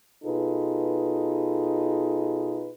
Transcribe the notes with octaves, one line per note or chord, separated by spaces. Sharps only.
B2 D#4 F4 G#4 A4 B4